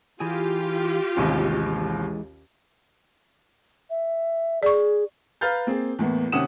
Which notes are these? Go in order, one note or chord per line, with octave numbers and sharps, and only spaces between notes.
E3 F4 G4 G#4
A1 D#2 C3 E3 G#3
E5
G#4 D5 C#6
B4 F5 A#5 F6 G6 A6
A#3 C4 G#4
E2 A2 A#3 B3
D#2 C3 C#4 F#5 D#6 E7